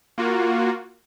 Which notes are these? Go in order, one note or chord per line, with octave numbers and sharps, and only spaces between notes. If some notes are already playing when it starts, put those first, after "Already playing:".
A#3 F4 F#4